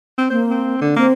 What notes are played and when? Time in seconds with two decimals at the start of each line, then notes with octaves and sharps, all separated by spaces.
0.18 C4
0.30 A#3 C5
0.50 C4
0.81 D3
0.96 A#3 C4